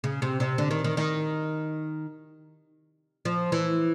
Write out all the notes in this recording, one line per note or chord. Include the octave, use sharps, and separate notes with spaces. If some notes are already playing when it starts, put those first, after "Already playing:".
C#3
C3
C3
D3
D#3
D#3
D#3
F3
E3